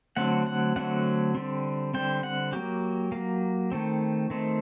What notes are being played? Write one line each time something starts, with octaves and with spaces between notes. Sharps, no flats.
D3 F#3 A3 C4 F#5
F#5
D3 F#3 A3 C4 F#5
D3 G3 C4
D3 G3 C4 G5
F#5
F#3 A#3 G4
F#3 A#3
D#3 A3 C4
D#3 A3 C4